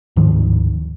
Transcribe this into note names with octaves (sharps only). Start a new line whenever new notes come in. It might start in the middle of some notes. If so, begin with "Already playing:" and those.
D1 G#2 D#3 F3